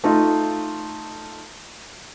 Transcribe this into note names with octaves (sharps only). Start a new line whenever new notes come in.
A3 D#4 F4